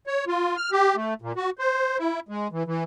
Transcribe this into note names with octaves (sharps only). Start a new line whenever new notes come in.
C#5
F4
F6
G4
A3
A#2
F#4
C5
E4
G#3
E3
E3